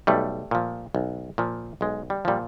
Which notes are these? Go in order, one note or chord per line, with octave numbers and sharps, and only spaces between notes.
B1 G3 A3
A#2 F3
B1
A#2 F3
B1 G#3
G3
A#2 F3 G3